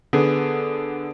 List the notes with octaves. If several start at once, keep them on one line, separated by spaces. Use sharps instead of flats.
D3 B3 G#4